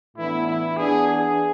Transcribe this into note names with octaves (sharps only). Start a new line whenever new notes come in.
A2 E3 B3 D4 E4
E4
E3 B3 D4 G#4
G#4